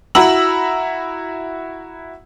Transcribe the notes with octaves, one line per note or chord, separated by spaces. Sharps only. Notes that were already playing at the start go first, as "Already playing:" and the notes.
E4 F#4 A#5 B5 E6 F#7